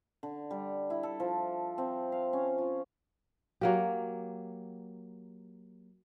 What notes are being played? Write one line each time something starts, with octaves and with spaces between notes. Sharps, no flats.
D3
G3
E4
A4
F3
C4
F5
C#4
F4
F#3 A#3 G4